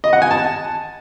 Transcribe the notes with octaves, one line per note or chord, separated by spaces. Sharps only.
D#5
F#5
G#5
A5